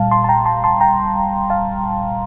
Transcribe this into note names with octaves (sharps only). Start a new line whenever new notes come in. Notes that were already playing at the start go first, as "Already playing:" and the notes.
Already playing: A#2 G3 F5 A5
A5 C6
A5
G5 A#5
A5 C6
A5 C6
G5 A#5
F5 A5